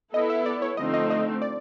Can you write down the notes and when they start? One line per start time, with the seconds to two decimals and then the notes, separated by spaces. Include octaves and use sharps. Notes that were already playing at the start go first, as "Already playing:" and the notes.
0.14 B3 E4 A4 D#5
0.30 E5
0.46 D5
0.62 C#5
0.77 D3 F3 A3 C4 D#4 D#5
0.94 D#5
1.10 D#5
1.42 D5